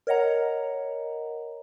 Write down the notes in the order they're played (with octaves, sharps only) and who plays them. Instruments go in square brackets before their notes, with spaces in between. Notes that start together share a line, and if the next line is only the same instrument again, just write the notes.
[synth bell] A#4 C#5 D#5 F#5 A#5